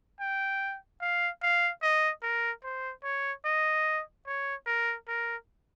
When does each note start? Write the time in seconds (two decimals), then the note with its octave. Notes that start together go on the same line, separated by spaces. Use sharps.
0.20 G5
1.01 F5
1.42 F5
1.82 D#5
2.23 A#4
2.64 C5
3.04 C#5
3.45 D#5
4.27 C#5
4.67 A#4
5.08 A#4